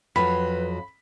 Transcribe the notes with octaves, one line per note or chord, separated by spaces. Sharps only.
F2 F#3 B4 B5